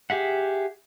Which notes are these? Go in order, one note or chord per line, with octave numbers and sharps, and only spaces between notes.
G4 G#4 E5 F#5